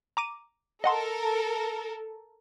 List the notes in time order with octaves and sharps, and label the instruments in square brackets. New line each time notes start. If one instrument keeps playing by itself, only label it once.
[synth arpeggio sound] A#5 D6 D#7
[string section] A4 A#4 [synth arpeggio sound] D#5 F#5 C6